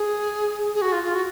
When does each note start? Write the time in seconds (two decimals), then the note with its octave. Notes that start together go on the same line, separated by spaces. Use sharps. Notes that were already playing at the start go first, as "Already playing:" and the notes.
Already playing: G#4
0.75 G#4
0.82 F#4
0.92 F4
1.03 F4
1.14 F#4